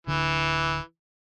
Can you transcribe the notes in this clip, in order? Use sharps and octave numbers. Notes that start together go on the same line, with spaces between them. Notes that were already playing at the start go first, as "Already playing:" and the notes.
D1 D3 E3